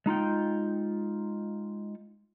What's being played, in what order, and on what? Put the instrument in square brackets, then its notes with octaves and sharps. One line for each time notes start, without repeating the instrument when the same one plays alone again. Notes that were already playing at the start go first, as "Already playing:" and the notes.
[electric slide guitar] G#3 D#4 F4 G5